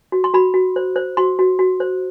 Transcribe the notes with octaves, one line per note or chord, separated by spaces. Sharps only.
F#4
C6
F#4 B5
F#4
C5
C5
F#4 C6
F#4
F#4
C5